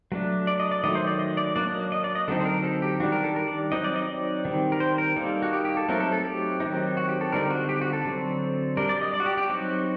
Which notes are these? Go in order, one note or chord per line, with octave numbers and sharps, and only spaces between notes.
F#3 A3 D4
D5
D#5
D5
D#3 F#3 A3 D#5
C5
D5
D#5
D5
F#3 A#3 D4 D5
D#5
D#5
D5
D#5
D3 F#3 C4 D#4 A4
C5
A#4
A4
G4
D#3 G3 D4 F#4
A#4
A4
A#4
D5
F#3 C4 D#4 D#5
D5
D#5
D5
D#3 G3 C4
A#4
C5
A#4
G3 A#3 D#4 A4
F#4
G4
G4
A4
F#3 A3 C4 D#4 A#4
A4
A4
G4
D#3 F#3 C4 D#4
F#4
G4
A4
D3 G3 C4 D#4 A#4
G4
F#4
G4
F#4
A4
D3 F#3 C4
G3 D4 A#4
D5
D#5
D5
F#4
G4
G4
F#3 C4 D#4 F#4